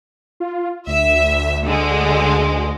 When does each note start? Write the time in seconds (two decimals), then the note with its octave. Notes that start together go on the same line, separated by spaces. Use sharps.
0.40 F4
0.87 D2 E5
1.66 D3 G#3